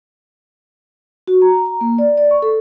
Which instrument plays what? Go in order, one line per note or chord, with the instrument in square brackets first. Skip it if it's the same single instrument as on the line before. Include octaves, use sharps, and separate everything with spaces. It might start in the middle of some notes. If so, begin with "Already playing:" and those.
[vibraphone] F#4
A#5
A#5
A#3
D5
D5
C#6
A4